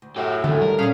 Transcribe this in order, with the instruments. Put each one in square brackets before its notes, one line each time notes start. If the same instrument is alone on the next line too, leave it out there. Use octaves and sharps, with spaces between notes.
[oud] D2
[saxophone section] F#2 A2 [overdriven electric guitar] F#4 G4
[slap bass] D3 [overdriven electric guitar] D#3 A3 [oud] A4
[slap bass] G3 [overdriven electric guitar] A#4
[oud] A#2 D4 [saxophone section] A3 G#4 F5 [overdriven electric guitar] C#4